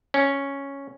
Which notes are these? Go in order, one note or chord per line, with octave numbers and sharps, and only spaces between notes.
C#4